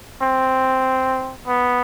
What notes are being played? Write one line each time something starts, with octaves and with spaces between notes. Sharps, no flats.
C4
B3